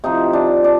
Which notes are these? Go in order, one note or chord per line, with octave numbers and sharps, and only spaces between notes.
C3 F3 D#4
D4
D4